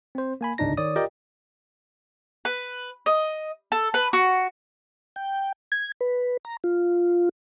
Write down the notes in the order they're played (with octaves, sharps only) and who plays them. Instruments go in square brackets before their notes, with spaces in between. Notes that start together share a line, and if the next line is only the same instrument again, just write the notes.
[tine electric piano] C4 C5
A#3 G#5 B5
G1 C#2 G#2 D4 D#4 A#6
D#3 C#5 D5 D#6
F4 G4 A#4 D5 D#5 G5
[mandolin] B4
D#5
A4
B4
F#4
[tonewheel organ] G5
G#6
B4
A#5
F4